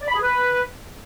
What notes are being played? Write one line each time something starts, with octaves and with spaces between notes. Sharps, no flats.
D5
B5
G#4
B4